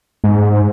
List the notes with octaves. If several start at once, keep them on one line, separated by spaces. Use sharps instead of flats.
G#2